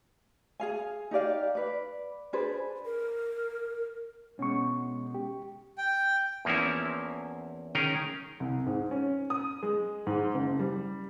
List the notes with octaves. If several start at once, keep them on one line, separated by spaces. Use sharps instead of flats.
G#4 F5 G#5
D#4 G4 D5 F5
B4 D5
D4 G#4 B4 C5
A#4
B2 G#3 C#4 C#6
G4
G5
E2 F3 A#3 C4 C#4 E4
D#3 C#4 G#4 A#4 G5
C2
G#2
C#4
D#6
G#3
G#2
F#1
G3